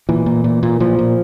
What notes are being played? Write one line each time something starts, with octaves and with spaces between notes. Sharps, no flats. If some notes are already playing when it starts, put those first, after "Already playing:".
A#2 E3
A#2
A#2
A#2
A#2 F3
A#2